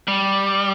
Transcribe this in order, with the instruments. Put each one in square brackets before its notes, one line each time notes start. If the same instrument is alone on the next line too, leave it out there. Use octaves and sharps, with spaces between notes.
[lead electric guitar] G3